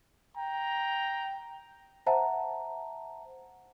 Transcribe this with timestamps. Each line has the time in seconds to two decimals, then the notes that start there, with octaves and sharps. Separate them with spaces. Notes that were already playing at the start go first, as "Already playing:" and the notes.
0.36 G5 A#5
2.06 C5 E5 F#5 A5 A#5